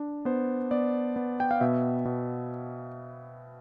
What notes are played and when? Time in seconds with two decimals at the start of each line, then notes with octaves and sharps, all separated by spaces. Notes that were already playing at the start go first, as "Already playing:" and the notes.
Already playing: D4
0.25 B3 C5
0.71 B3 D5
1.16 B3
1.40 G5
1.51 F5
1.61 B2 E5
2.05 B2